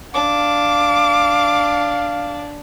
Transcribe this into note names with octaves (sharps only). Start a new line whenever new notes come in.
D4 F5 D6